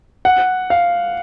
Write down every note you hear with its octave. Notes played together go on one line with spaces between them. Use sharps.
F#5
F5